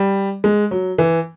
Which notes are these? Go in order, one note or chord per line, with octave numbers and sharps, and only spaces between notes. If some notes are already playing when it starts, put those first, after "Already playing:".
Already playing: G3
G#3
F#3
E3